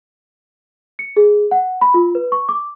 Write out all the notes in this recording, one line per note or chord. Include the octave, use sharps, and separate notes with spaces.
C#7
G#4
F#5
B5
F4
B4
C#6
D6